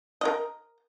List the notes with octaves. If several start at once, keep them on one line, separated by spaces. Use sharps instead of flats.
A#4 D#5